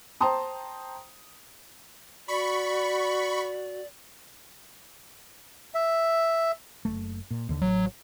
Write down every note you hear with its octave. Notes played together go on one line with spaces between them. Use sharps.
C5 G5 A5 A#5 C6 D#6
F#4 D5 B5 C#6
E5
F#1 A3
A#2
D#2 D3
A1 F#3